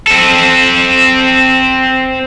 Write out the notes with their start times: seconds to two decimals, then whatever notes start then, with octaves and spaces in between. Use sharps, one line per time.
0.07 C4 A4